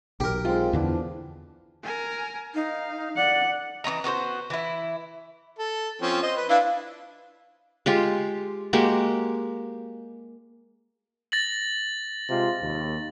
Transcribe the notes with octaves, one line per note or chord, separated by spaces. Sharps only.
B1 G4 A#4
G#3 C4 F4
E2 D3 E3 F3 B3 D4
A#4 G#5
D#4 F5
D5 F#5
E3 C#4 D#5 A#5
B3 F#4 G4 C5
E3 E4
A4
F3 C4 C#4
C5 D#5
B4
D4 E4 B4 F5
G#3 F4 G4
G#3 A#3 F#4 G4
A6 A#6 F#7
C3 G#3 F4
D#2